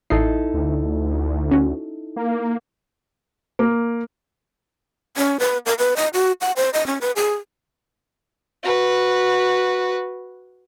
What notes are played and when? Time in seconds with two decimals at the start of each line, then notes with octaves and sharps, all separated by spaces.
0.10 A1 D#4 E4 A4 D#5 C7
0.54 D2
1.52 C#4 F#4
2.16 A#3
3.59 A#3
5.17 C#4
5.40 B4
5.66 A#4
5.79 B4
5.96 D#5
6.14 F#4
6.41 F#5
6.56 C5
6.74 D#5
6.87 C#4
7.01 B4
7.16 G#4
8.63 F#4 B4